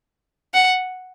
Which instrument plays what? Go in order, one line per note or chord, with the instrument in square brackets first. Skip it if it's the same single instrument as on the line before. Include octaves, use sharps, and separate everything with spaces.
[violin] F#5